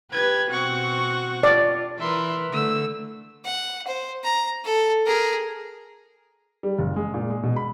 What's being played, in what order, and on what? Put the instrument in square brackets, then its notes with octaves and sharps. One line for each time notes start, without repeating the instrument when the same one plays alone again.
[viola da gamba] G4 B4 [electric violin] G#6
[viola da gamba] B2 C4 F#4 [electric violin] F#5 C#6
[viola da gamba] F4 [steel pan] D5
[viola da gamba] E3 A#4 B4 [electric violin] E5 C6
[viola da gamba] D3 A3 [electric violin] E6
[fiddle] F#5
C5
A#5
A4
G#4 A#4
[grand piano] G3
F#1
G#3
A#2
G#3
B2
B5